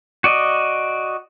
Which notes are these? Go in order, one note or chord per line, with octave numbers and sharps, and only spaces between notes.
F#4 D5 D#5